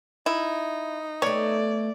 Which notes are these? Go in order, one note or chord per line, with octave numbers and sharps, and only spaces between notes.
D#4 E4
A3 B3 C#5 D5